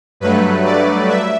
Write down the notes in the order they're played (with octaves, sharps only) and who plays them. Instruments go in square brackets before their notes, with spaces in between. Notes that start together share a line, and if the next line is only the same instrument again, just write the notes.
[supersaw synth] G2 F#3 A3 B4
D5
E5